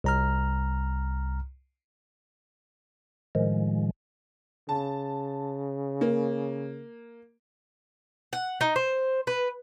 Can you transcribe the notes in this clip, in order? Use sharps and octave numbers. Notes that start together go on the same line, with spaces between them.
C2 A#5 F6
A2 D#3 F3 G#3
C#3 A5
A#3
F#5
D#4
C5
B4